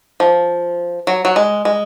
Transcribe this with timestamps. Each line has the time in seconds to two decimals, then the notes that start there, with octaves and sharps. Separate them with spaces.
0.20 F3
1.07 F#3
1.25 F#3
1.36 G#3
1.65 G#3